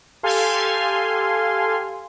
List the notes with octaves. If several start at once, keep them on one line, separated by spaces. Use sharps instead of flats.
G4 A4 F5 G#5 C6